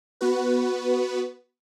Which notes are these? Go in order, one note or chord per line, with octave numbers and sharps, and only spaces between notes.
B3 F#4 B4